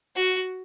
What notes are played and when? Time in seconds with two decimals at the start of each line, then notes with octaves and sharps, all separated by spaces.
0.16 F#4